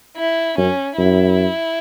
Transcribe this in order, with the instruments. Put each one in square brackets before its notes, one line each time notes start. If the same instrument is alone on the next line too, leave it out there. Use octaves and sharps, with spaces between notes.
[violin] E4
[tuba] F#2 [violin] C#4
[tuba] F#2 [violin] E4